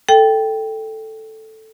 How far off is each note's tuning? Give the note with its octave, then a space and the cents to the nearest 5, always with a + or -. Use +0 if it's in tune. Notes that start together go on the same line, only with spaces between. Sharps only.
A4 +0 G5 +0